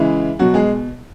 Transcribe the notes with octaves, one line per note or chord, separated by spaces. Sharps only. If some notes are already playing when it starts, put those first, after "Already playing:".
Already playing: C#3 E3 G#3 E4
B2 F#3 F#4
G#3 G#4